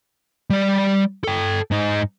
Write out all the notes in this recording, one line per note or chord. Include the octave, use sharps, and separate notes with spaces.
G3 D5
A4 G5
G#2 D#4